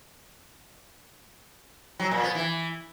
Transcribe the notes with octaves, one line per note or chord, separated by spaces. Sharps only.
F#3
A#2
B3
E3